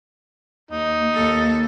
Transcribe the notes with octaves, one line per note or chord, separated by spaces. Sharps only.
D#2 D#4
D#2 A4